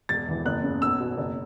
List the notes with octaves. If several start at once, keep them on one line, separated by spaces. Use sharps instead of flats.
E1 A6
E2 E3
F#1 F#6
E2 C#3
B1 E6
B2
F#1